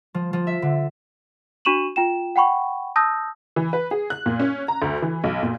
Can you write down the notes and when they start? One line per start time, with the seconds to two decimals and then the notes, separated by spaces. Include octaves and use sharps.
0.14 F3
0.33 F3
0.47 E5
0.62 D3
1.65 D4 F#4 C#6 D#7 E7 F#7
1.96 F4 G5 E7
2.36 F#5 G5 B5 C#6
2.96 A5 D#6 E6 G6 A#6
3.56 E3
3.73 B4
3.91 G#4
4.10 F#6
4.26 A#2
4.40 C#4
4.68 A#5
4.82 D2
5.02 E3
5.24 B1
5.43 A#2